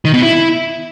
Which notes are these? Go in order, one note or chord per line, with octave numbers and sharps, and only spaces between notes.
D#3
B2
E4